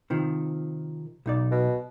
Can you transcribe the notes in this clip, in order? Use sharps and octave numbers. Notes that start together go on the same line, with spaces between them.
C3 D#3 F3
B1 D#4 D5
B2